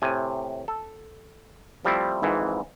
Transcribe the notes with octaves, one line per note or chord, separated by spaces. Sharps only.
A2 C3 G#5
A4
F3 G3 A3 C4 E4
G#1 F2 G#2 E3